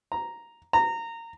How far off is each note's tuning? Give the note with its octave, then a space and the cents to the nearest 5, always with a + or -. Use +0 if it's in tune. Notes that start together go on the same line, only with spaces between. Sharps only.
A#5 +0
A#5 -20